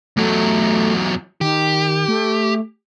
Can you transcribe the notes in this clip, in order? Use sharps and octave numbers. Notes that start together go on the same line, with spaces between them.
E2 F#3 A3
D#3 G4
A3